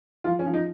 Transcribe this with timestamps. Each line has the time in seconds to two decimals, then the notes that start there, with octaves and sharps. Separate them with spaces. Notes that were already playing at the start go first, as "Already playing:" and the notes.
0.24 F3 F4
0.39 C#4
0.46 F3
0.54 D#4